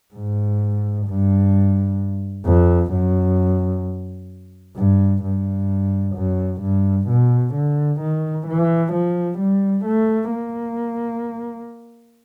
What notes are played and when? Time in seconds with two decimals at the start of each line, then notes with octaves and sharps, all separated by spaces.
0.15 G#2
1.07 G2
2.46 F2
2.93 F#2
4.77 G2
5.23 G2
6.15 F#2
6.61 G2
7.08 B2
7.54 D3
8.00 D#3
8.47 E3
8.93 F3
9.39 G3
9.85 A3
10.31 A#3